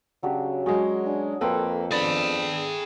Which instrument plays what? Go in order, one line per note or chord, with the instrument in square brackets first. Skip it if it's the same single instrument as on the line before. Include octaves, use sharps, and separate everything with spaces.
[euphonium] C#3 [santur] F#3 D4 G4
[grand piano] F#3 G#3 [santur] C#4 F#4 G#4
[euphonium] D4 [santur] G#5
[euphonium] F2 [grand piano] A#3 B4 [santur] A4 G5 C6
[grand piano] B3 D4 A6 [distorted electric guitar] G#4 B5